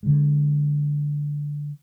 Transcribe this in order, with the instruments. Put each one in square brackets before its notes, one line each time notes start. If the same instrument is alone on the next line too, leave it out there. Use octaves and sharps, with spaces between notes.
[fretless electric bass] D3 G#3